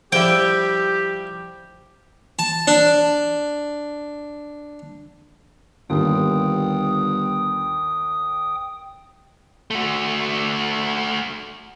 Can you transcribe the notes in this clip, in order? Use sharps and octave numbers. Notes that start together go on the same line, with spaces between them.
F3 G3 E4 G4 G5
A5
D4
G1 D#2 G5 D#6
A3 F#4